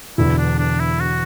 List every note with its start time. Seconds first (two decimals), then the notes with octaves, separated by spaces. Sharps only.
0.18 E1 E2 D3 E4
0.38 D4
0.58 D4
0.80 E4
1.00 F#4